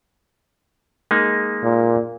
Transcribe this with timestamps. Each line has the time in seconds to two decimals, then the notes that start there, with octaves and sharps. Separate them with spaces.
1.11 G#3 A#3 D#4
1.63 A#2